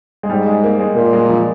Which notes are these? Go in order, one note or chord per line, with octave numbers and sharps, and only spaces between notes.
G#3
G#2 G3
G#3
A#3
G#3
A#2 A#3
G#3
F3